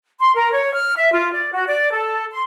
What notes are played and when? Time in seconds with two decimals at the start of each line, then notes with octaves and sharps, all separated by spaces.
0.19 C6
0.34 A#4
0.52 C#5
0.73 F6
0.96 E5
1.12 F4
1.32 D5
1.52 F#4
1.67 D5
1.92 A4
2.32 C6